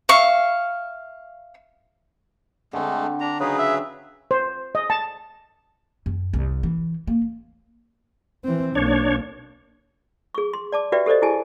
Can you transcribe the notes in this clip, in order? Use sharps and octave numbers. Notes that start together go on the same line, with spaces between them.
E5 F5 C#6
D3 G#3 A3 C4
D4 A#5
C#3 F#3 D#4 G#4 B4
E5
C5
D#5
A5
F#2
C2
E3
A#3
E3 C4
B1 A#3 D4 C#5
G#4 C#6
C6
D5 A5 D6
F#4 G4 B4 D5 E5 G5
G4 A4 C5 D5 D#5
E4 G4 G#4 G#5 A5